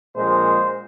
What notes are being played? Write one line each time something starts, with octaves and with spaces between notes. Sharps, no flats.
A#1 A#2 G#3 C5